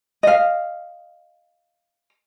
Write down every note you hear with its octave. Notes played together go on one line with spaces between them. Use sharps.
D#5 F5